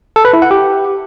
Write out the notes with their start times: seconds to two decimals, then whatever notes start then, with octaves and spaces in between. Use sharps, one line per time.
0.16 A4
0.25 B4
0.33 E4
0.42 F#5
0.51 G4